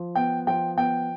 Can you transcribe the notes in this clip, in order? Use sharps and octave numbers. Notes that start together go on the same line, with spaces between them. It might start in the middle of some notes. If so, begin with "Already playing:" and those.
Already playing: F3
B3 G5
F3 G5
B3 G5